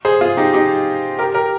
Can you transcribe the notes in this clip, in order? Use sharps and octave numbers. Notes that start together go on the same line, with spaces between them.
G#4 C5
F4 G#4
D#4 G4
D#4 G4
G4 A#4
G4 A#4